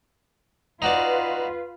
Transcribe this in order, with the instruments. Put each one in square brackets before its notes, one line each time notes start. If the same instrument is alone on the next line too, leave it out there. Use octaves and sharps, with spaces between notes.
[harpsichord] D#4 F#4 D5 [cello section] F4 B4